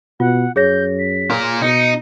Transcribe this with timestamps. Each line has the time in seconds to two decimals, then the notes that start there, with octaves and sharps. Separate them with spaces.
0.20 B2 F4 F#5
0.56 F#2 G#4 C#5 G6 A#6
0.99 B6
1.30 A#2 A#4
1.62 B2 D#4 C#7